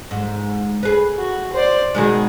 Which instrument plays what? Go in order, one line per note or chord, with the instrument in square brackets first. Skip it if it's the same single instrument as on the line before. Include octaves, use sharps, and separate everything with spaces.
[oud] G#2
G#4 B4
[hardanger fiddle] F#4
C5 D5
[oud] B2 D#3 G#3 [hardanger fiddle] G#4